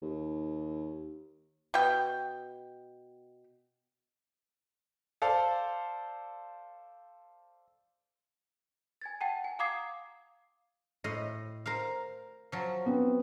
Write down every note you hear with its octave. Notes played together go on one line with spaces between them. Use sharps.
D#2
B2 G5
A4 C5 D5 F5 A5
G#5 G#6 A6
F#5 G5 A5
G#5
F5 A#5 D6 D#6 G#6 C7
A2 D#5 C6
A#4 C5 F5
F3 F#3
B3 C4